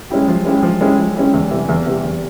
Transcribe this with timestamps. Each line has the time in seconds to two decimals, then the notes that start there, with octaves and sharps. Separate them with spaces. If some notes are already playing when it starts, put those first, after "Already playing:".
0.10 G#3 C#4 E4 G4
0.28 F3
0.45 G#3 C#4 E4 G4
0.63 F3
0.81 G#3 C#4 E4 G4
0.98 F3
1.16 G#3 C#4 E4 G4
1.33 E2
1.51 C3 E3 G3
1.68 E2
1.86 C3 E3 G3
2.04 E2